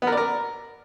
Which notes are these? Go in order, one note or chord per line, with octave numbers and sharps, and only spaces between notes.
B3
A#4
D5
A#4